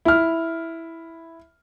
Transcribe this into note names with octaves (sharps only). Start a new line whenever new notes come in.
E4 F6